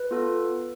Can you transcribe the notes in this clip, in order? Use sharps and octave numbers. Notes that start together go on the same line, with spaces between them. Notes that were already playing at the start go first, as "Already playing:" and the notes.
Already playing: B4
B3 F4 A4